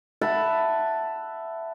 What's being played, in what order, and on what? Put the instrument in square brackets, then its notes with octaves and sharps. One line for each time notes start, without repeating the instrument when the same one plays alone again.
[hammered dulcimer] E5 F#5 A5 B5